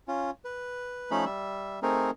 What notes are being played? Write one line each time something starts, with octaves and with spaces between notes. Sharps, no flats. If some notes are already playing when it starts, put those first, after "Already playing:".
C#4 F4
B4
F3 A3 C#4 D#4 B5
G3 E5
A3 C4 D#4 G#4 A#4